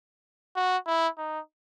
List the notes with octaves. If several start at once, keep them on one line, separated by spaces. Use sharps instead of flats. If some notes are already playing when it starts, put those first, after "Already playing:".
F#4
E4
D#4